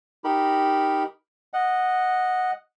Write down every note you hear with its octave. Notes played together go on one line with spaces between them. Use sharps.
D#4 G4 A#4 B5
D#5 F#5